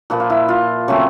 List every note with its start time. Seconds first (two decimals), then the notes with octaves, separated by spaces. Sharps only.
0.10 A#2 F3 A#3 B4
0.20 F4
0.30 E4
0.49 F4
0.88 C#3 F#3 A3 C4